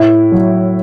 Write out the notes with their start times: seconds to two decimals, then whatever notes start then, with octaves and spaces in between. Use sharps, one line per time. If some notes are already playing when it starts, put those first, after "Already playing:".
Already playing: A2 E4
0.32 F#3